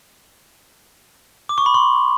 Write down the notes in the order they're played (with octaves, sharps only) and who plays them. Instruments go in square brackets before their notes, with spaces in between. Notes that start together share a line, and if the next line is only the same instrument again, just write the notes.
[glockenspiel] D6
C#6
B5
C6